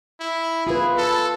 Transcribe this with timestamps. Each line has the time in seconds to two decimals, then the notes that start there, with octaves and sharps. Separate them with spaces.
0.20 E4
0.67 F4 G#4 B4
0.98 A4